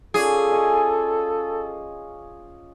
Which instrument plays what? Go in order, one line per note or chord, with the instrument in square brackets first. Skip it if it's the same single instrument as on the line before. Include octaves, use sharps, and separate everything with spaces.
[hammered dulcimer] C#4 F4 D5 [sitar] G#4 [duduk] A4
[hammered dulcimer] D#5 G#5 C#6